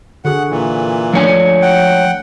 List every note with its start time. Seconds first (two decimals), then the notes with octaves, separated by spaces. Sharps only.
0.25 D3 F#4 G#4 F#5
0.50 A#2 E3
1.13 F3 A3 D4 C#5 G#5
1.62 F#5 G5